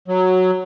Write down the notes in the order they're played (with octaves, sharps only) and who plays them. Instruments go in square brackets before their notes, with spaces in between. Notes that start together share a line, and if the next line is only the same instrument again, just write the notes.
[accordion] F#3